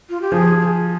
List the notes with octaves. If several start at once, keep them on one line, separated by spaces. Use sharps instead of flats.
F4
G4
F3 G#4